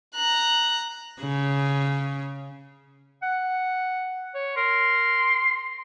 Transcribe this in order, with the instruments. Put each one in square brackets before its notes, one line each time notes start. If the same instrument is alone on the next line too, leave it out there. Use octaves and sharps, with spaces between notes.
[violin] A#5 F#6
[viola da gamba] C#3
[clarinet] F#5
C#5
[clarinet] A#4 [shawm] C6